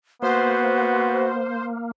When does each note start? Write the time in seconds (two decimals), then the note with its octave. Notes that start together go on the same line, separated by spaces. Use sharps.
0.22 A#3 B3 F#4 C5